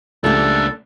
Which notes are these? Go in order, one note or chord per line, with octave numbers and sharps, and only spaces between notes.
C#2 A3 A#3 D4 G4 A4